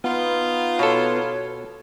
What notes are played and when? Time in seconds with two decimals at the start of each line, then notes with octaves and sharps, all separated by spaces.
0.04 B3 D#4 F4
0.79 B2 A4 C#5